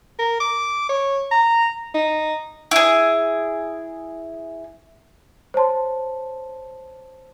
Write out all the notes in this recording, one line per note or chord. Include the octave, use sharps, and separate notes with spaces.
A#4
D6
C#5
A#5
D#4
E4 G#4
C5 C#5 A5 C6